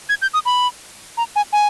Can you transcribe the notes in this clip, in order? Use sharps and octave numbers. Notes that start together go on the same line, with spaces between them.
G#6
G6
D#6
B5
A#5
G#5
G#5